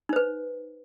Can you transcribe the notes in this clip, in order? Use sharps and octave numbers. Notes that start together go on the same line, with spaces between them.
D#4 B4 C5